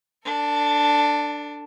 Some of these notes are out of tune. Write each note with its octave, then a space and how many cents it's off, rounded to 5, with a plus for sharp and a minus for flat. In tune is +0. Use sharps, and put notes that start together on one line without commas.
D4 +0 A4 +40